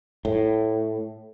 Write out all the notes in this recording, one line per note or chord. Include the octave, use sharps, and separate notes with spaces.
A2